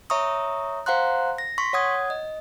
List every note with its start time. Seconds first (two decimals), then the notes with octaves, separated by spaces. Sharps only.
0.10 C#5 E5 A#5 C#6 D#6
0.86 C5 F5 F#5 A#5 C6 F#6
1.38 A#6
1.58 C6 C#6 B6
1.73 C#5 F#5 D#6 G#6
2.10 D#5